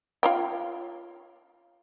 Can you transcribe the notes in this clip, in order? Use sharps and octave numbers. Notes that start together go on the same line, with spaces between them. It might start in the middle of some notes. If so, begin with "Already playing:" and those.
F4 C#5 G5